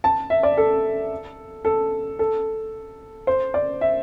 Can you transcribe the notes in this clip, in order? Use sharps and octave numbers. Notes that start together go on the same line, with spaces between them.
A5
E5
D5
A4
A4
A4
C5
D5
E5